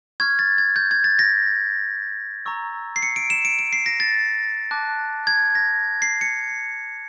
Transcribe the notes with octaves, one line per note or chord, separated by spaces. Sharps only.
C#6 F6 G#6
A6
G#6
G6
G#6
A6
A#6
A#5 C#6 E6
C7
C#7
D7
E7
D7
D7
C7
A#6
A6
A5 D6 F#6
G#6
A#6
C7
C#7